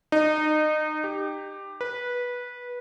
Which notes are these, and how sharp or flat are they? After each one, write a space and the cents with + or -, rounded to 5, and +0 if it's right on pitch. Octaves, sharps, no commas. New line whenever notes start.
D#4 -25
G4 +10
B4 -15